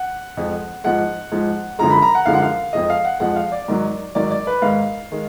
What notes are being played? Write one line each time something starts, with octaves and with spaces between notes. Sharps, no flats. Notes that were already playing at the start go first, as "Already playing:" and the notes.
Already playing: F#5
F2 F3 G#3
G#2 F3 G#3 F#5
G#2 F3 G#3
F#2 D3 F3 G#3 A#5
B5
A#5
F#5
F#2 D3 F3 G#3 F5
F#5
F5
F2 F3 G#3 D#5
F5
F#5
F2 F3 G#3 F#5
F5
D5
G#2 D#3 F#3
G#2 D#3 F#3 D5
D5
B4
G#2 D#3 G#3 F5
D#3 G#3